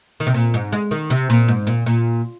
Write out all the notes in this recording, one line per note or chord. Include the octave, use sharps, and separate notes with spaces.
D#3
C3
A#2
G#2
G#3
D#3
C3
A#2
G#2
A#2
A#2